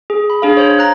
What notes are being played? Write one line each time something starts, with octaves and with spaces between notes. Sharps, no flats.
G#4
B5
D4 G#4 F5
C5 C#5
A#5 F#6